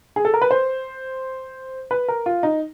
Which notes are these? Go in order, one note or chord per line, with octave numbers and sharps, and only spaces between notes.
G#4
A4
A#4
B4
C5
B4
A#4
F4
D#4